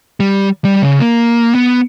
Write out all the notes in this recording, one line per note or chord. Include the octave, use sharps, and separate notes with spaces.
G3
G3
C#3
A#3
B3